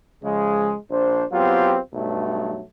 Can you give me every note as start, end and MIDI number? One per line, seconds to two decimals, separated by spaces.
0.23 0.76 49
0.23 0.76 53
0.23 0.76 56
0.90 1.23 34
0.90 1.23 62
0.90 1.23 72
1.33 1.77 54
1.33 1.77 59
1.33 1.77 60
1.33 1.77 65
1.33 1.77 67
1.94 2.61 35
1.94 2.61 43
1.94 2.61 54
1.94 2.61 57